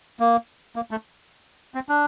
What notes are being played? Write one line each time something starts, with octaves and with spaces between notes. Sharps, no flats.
A#3
A#3
A3
C4
D4